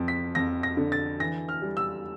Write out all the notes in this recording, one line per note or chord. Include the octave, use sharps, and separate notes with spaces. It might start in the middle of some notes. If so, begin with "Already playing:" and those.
Already playing: F2 F3
B6
F2 A#6
A#6
D3
A6
E3 A#6
F6
G3
E6